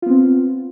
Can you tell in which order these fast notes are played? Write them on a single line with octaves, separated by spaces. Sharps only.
F4 B3 C4